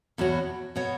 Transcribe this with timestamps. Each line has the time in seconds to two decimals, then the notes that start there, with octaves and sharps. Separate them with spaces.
0.18 E2 B2 B3 F#4 C#5
0.76 B2 B3 F#4 C#5